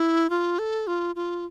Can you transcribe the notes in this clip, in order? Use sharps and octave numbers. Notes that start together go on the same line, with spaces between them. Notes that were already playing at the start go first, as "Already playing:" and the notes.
Already playing: E4
F4
A4
F4
F4